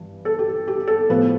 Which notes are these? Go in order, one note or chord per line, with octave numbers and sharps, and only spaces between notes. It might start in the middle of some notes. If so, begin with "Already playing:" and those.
Already playing: G2 E3
A4
G4
G4
A4
A2 F3 B3